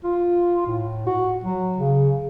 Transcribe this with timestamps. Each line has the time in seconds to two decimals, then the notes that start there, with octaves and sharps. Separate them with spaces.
0.04 F4
0.67 A2
1.07 F#4
1.44 F#3
1.78 C#3